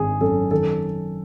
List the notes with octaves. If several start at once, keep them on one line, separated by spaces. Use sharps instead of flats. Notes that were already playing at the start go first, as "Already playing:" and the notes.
Already playing: G#1 D#3 G#4
F#2 A4
D#3 A4